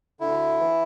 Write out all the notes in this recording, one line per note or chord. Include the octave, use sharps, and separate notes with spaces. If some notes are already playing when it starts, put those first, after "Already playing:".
D2 D3 E4
E3